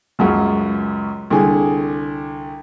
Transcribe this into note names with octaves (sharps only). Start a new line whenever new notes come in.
C#2 F#2 C#3
C2 D3 G#4 G#5